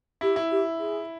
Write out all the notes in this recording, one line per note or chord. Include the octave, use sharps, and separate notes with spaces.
E4 G4
E4
G4
G#4